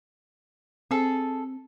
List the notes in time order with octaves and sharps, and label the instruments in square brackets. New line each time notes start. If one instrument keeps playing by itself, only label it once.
[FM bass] C4 [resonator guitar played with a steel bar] G#4 A4